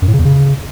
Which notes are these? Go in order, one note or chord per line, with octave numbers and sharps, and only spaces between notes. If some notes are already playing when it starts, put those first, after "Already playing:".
F#2
A2
C#3
E2
C#3